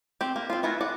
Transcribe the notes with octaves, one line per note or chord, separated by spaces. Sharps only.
C4 G4
A#3
C4 F4
A3 B3 E4 A#4
D5 F#5